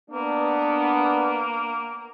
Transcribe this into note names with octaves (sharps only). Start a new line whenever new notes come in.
A#3 B3 D4